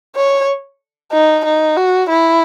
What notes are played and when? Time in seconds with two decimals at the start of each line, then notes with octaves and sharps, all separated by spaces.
0.16 C#5
1.12 D#4
1.45 D#4
1.76 F#4
2.09 E4